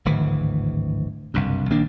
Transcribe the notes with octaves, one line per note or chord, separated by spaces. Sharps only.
D1 G#1 D2 E3
F#1 C2 G2
A#1 D#3 A#3 D4